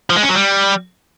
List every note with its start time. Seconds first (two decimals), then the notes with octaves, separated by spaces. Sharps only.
0.10 F3
0.16 G#3
0.23 C#4
0.29 F#3
0.35 G3